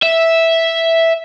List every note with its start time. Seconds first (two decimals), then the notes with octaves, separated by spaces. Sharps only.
0.03 E5